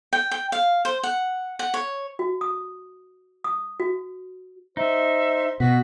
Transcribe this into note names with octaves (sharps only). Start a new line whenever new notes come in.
G5
G5
F5
C5
F#5
F#5
C#5
F#4
D#6
D#6
F#4
D#4 C5 E5
B2 F#4 B6